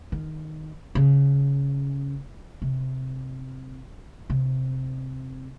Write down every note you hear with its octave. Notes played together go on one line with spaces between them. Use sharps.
D#3
C#3
C3
C3